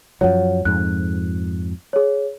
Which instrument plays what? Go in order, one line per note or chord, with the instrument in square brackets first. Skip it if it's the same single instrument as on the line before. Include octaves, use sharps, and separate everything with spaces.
[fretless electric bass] F#2 F3 F#3 [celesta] C#5 F#5
[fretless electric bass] F2 G#2 [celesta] F#6
[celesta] G#4 C#5